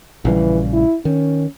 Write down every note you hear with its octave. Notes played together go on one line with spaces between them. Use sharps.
A#1 C#3 E3 G3
E4
D#3 C#4